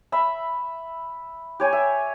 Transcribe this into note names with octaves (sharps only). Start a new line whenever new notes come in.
E5 B5
G4 C#5 G#5
E5